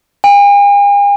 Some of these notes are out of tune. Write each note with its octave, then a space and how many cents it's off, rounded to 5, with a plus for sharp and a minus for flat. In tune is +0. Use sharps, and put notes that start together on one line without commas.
G#5 -45